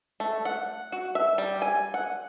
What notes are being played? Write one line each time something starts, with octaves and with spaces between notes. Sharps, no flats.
A3
F#5
F#4
E5
G3
G#5
F#5